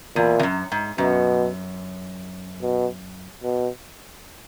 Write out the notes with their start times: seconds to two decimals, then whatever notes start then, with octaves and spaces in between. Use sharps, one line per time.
0.16 E2 A#2
0.39 E2
0.43 F#2
0.72 G#2
0.98 F#2 B2
2.62 B2
3.43 B2